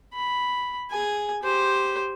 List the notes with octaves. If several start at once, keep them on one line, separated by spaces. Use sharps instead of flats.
B5
G#4 G#5
G4 C5